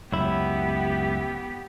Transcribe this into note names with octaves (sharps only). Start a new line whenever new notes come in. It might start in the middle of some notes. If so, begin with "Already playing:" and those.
C#2 F#2 B3 E4 G4